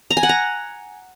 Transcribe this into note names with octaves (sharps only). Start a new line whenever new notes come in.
A#5
G#5
F#5
A#5